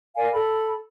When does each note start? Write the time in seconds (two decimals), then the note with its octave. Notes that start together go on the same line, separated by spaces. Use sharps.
0.16 A#4 D5 F5 G#5
0.33 A4 B5